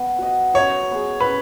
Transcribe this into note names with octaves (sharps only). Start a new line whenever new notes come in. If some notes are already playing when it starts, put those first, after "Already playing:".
Already playing: B3
F#4 D#5
F#3 C#5
B3 G#4
B4